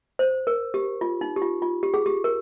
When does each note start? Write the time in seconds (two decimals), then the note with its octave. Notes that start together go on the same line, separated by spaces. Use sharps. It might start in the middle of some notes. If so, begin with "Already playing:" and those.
0.19 C5
0.47 A#4
0.74 G4
1.01 F4
1.21 D#4
1.36 G4
1.42 F4
1.62 F4
1.83 G4
1.94 G#4
2.06 G4
2.24 A#4